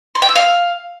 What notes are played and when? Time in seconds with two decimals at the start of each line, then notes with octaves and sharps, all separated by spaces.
0.15 C6
0.22 G5
0.29 E6
0.36 F5